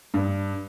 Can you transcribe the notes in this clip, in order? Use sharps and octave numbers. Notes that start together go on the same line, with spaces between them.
G2